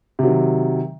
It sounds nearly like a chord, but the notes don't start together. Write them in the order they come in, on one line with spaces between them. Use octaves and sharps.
C3 F#3 D#3